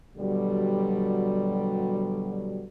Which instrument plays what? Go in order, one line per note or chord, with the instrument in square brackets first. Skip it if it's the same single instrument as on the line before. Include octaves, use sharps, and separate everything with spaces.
[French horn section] B2 D3 F#3 G3